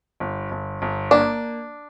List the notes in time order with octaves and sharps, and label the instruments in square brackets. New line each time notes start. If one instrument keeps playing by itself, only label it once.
[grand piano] G1
G1
G1
[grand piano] A#3 [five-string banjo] D4